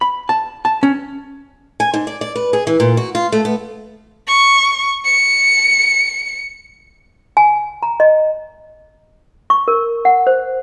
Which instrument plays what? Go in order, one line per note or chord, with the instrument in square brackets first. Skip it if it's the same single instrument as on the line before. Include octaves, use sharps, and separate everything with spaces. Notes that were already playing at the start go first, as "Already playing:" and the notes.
[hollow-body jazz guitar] B5
A5
A5
C#4
[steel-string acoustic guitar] G#5
G#2
D5
D5
B4
G#4
E3
A#2
F#4
F4
A3
B3
[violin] C#6
C#7
[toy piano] G#5
A#5
D#5
C#6
A#4
F#5
C5